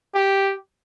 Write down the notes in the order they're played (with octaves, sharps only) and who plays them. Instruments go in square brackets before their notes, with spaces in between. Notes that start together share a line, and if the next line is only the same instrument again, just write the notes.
[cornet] G4